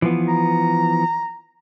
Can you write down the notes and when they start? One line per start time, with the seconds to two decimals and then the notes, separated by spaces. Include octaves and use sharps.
0.02 E3 F3 B3
0.28 A#5